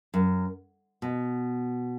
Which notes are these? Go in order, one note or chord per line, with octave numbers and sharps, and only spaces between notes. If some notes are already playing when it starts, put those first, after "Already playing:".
F#2
B2